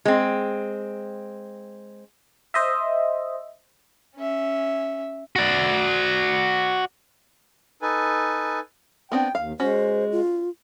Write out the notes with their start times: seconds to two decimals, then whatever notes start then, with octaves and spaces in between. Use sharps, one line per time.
0.05 G#3 C4
2.54 C5 D#5 E5
4.16 C#4 E5
5.36 F#4 D5
7.82 D#4 A4 B4 G#5
9.12 B3 C4 D4 G5
9.35 D#2 F5
9.60 G#3 C#4 F#4 C5
10.12 F4